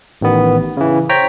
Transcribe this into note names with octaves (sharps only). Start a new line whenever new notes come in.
A1 D#3 B3
C#3 E3
C5 C#5 G5 A#5 B6